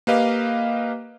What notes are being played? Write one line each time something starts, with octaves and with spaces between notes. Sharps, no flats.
A#3 G4 B4 D#5 F5